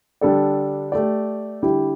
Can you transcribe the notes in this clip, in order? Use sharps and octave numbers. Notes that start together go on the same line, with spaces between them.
D3 G3 D4 A4 D5
A3 G4 D5
D3 G3 E4 G4